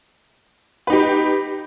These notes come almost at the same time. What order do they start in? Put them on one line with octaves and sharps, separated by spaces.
B4 D#4 G4